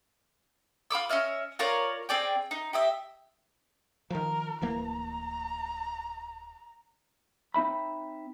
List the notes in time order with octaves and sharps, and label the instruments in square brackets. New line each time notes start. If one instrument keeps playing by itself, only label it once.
[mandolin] F4 B5 D6 E6
C#4 D#5 E5 F6
F4 A#4 C#5 D5
C4 G#4 D5 G5
D#4
G4 D#5 E5
[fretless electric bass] D#3 F3 [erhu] A#4
[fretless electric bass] D1 E3 A#3 [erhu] A#5
[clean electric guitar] C4 D#4 E5 B5